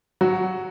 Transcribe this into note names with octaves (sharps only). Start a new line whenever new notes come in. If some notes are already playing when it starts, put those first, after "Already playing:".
F#3 F#4